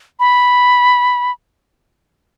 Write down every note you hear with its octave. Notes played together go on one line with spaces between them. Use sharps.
B5